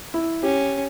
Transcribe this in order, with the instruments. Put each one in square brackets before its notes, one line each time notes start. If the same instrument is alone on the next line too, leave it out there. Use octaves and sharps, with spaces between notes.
[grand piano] E4
[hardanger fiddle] C#4 [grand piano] G4